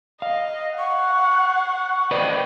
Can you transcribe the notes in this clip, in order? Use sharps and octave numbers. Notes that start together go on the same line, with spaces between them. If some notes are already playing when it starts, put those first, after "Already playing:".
D#5 F5
F#5 C#6
B4 D5 D#5 G5